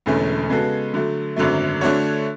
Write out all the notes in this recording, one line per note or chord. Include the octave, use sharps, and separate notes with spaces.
E1 E2 D3 A3 C#4
C#3 G#3 B3 F#4 A4
D3 F#3 A3
G#1 F#2 D3 F#3 A3
D3 A3 D4 F#4 C#5